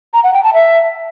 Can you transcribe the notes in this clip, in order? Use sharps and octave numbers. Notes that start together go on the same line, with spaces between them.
A#5
F#5
G5
A5
E5